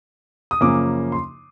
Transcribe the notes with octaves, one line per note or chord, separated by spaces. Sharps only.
D#6
F#2 C#3 F3 A#3 C#4 D6
C6